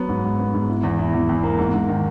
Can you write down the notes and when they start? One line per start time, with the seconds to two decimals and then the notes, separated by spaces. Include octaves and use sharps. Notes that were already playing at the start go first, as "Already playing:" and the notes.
Already playing: F#3 B3
0.09 G#2
0.24 G#2
0.39 B3
0.54 G#2
0.69 E4
0.83 E2
0.99 E4
1.14 E2
1.29 E2
1.43 A#3
1.59 G#2
1.74 G#2
1.89 D#3